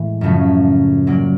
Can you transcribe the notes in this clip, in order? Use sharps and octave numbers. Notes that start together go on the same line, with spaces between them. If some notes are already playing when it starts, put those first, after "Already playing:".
Already playing: A2 E3 G#3
F#2 C#3 F3 A3
A#2 F#3 A#3 D5